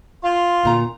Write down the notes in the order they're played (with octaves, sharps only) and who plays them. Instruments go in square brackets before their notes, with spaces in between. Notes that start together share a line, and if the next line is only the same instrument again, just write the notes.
[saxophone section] F4 [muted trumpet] C6
[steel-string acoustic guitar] D2 A#2 A#5